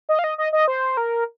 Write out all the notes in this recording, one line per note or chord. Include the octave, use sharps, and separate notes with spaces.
D#5
F5
D#5
D#5
D#5
C5
A#4